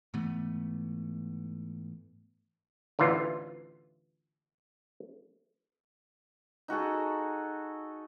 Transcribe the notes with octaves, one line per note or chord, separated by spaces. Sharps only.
G#2 E3 A3 B3
A1 D2 E3 F4
D#4 F#4 G#4 A4